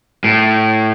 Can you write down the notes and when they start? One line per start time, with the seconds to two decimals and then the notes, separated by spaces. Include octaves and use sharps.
0.24 A2